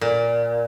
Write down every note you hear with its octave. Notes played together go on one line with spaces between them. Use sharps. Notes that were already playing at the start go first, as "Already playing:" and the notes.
A#2